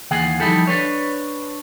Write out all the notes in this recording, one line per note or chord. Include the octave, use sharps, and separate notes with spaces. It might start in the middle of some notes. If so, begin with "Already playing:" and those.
D#2 E3 G#4 F5 F#5 G#5
F3 G3 D#4 E4 G4 A4
D4 B4 C#5